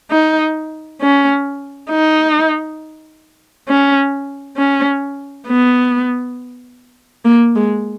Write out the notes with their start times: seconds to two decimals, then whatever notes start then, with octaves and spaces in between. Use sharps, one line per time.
0.11 D#4
1.01 C#4
1.90 D#4
3.69 C#4
4.57 C#4
5.47 B3
7.25 A#3
7.55 G#3